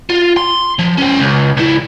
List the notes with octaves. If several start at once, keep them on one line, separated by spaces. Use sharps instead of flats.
F4
C6
F3
C#4 C5
C#2
C#2 E4